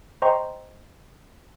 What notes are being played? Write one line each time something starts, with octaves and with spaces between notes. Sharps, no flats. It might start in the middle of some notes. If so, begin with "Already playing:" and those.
C5 D#5 G5 A#5 C6 C#6